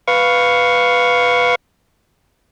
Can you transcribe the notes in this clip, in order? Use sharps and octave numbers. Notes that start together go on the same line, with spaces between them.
B4 F5 C#6